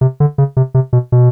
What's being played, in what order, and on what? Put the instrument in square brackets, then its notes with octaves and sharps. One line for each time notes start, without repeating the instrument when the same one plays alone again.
[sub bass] C3
D3
C#3
C3
C3
B2
B2